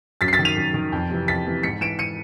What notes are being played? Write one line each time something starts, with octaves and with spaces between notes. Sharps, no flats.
F#2 A6 B6
C7
A6 B6
D#3
D#7 F7
F#2
D#3
F2
C3 E3
F2 A6 B6
C3 E3
G#2 B6 C#7
E3 D7 E7
C#7 D#7